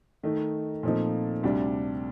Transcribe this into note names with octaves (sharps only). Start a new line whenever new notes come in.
D#3 A3 D#4
A#2 F3 A3 C4 D#4
D2 C3 G3 D4